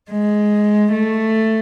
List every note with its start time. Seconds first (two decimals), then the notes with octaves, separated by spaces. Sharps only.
0.11 G#3
0.92 A3